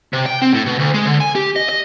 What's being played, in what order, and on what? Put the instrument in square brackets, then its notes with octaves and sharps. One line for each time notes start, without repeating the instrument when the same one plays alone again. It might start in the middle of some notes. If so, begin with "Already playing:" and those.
[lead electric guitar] C3
G5
C4
A2
B2
D2
G#3
D3
G#5
G4
D#5
D#5